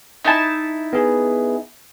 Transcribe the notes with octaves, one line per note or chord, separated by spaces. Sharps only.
D#4 E4 A5
B3 G#4